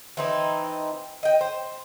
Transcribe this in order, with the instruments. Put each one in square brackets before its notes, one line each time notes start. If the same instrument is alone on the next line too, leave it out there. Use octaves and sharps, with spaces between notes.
[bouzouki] E3 C4 D#4
D#5 G5
C5